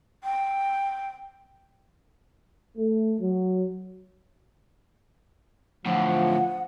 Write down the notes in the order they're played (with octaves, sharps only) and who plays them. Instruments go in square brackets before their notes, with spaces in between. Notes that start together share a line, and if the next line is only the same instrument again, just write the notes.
[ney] G5
[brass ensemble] A3
F#3
[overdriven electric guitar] A2 D3 [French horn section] F3 [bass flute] F#5